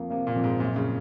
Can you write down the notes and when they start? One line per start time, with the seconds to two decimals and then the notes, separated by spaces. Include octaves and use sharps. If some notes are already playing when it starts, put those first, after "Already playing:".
Already playing: F2 A#3
0.10 C3 A#3
0.27 A#2
0.36 F2
0.44 G#2
0.60 F#2 A#2
0.76 C#3